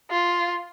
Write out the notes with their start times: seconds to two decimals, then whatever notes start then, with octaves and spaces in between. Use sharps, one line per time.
0.10 F4